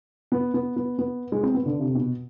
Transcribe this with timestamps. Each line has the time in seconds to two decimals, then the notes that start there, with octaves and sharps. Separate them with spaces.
0.32 B3
0.54 B3
0.76 B3
0.99 B3
1.32 G#3
1.43 C4
1.54 B3
1.66 D3
1.80 C3
1.95 B2